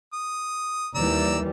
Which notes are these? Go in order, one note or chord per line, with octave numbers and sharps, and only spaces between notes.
D#6
D#2 E3 G3 D5 A#5 E6